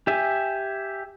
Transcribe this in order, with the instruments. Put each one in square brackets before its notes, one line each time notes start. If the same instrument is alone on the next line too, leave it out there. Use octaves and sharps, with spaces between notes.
[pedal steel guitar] G4 E5 G#5